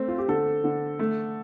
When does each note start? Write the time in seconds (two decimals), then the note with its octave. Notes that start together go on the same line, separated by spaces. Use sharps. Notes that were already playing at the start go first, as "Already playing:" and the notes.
Already playing: A3 C4
0.08 F4
0.18 G4
0.28 D3 A4
0.64 D3
0.99 A3